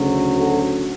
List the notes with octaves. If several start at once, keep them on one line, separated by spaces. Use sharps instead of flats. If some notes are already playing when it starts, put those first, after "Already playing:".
Already playing: D2 C#3 F#3
F#4 A4